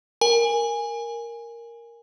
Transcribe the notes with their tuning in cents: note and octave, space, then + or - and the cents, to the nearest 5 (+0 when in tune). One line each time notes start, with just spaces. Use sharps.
A#4 +0 G#5 -10